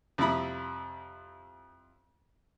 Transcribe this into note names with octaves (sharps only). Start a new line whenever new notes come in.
F2 C3 G3 E4 B5 D#6